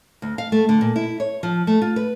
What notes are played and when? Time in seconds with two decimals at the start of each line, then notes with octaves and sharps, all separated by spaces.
0.22 D2
0.38 F5
0.52 A3
0.69 D3
0.81 A#2
0.96 E4
1.20 C#5
1.43 F3
1.67 A3
1.82 F4
1.96 B4